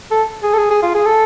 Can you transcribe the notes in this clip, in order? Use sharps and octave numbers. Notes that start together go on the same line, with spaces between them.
A4
G#4
A4
G#4
G#4
F4
G#4
A4